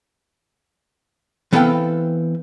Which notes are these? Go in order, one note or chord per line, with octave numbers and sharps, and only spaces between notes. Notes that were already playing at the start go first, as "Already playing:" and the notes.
E3 B3 C4 A4 F5 G5